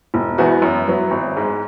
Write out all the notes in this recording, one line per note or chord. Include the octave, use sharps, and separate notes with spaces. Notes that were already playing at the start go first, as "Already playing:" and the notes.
E1
E2 E3 B3 F#4
F#2
F#3 B3 E4
G#1
G#2 G#3